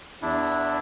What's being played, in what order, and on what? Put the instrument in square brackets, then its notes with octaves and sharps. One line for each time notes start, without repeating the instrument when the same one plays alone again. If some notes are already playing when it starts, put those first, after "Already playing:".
[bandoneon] E2 D4 E4